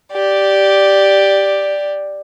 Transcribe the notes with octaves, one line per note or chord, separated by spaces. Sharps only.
G4 D5